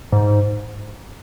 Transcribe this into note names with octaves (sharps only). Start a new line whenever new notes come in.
G#2